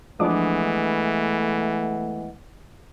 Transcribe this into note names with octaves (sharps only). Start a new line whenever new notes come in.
E3 F3 G#3 A3 B3 D4 D6